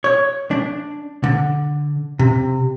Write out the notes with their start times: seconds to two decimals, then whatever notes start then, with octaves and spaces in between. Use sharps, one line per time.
0.04 C#5
0.51 D4
1.24 D3
2.19 C3